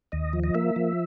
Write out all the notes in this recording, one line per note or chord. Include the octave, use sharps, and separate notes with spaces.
D#2 D#5
F3
D#5
A#3 E5
F3